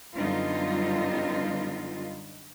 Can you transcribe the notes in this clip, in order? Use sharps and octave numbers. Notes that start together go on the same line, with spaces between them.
F#2 D3 G3 B3 D#4 F4